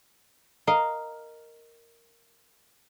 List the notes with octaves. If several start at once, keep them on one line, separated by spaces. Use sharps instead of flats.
A#4 D#5 F5 A#5